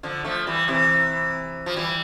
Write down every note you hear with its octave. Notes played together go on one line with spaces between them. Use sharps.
D3 F3
F3 A3
E3 G3
C3 E3
F3
E3 G3